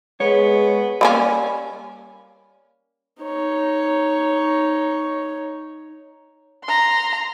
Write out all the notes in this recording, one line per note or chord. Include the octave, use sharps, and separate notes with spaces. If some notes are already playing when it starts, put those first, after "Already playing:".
G#3 B3 C#5
G3 A#3 C#4
D#4 C#5
A#5 C6